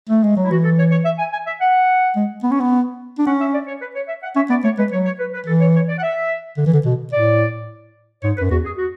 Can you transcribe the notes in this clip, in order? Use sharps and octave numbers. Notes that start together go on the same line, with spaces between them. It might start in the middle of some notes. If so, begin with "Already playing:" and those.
A3
G#3
F#3
E4
E3 F#4
A4
C#5
C#5
E5
G#5
G#5
E5
F#5
G#3
B3
C#4
B3
D4
C#4 F#5
E5
D5
C#5
B4
C#5
E5
F#5
C#4 E5
B3 D5
A3 C#5
G#3 B4
F#3 C#5
C#5
B4
B4
E3 A4
C#5
C#5
D5
F#5
E5
D3
E3
D3
B2
A2 D5
G#2 C#5
B4
F#2
E2 F#4
G#4
F#4